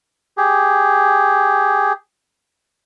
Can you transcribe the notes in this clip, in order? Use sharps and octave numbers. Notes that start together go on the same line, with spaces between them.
G4 G#4